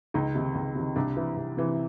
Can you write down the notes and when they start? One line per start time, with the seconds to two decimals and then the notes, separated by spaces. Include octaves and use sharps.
0.14 C#2 D#4
0.35 C3 D#3
0.55 C#2
0.75 C3 D#3
0.96 C2 D4
1.17 C3 E3
1.37 C2
1.57 C3 E3